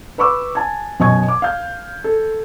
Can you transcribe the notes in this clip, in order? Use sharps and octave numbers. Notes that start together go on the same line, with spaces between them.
B4 B5 C#6 D6 E6
G#5 A5 G#6
F#2 B2 D#5 G#5 C#6 G#6
D6
F5 G6
A4